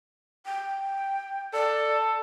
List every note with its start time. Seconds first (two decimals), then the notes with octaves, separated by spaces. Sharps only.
0.46 G5
1.53 A4 D5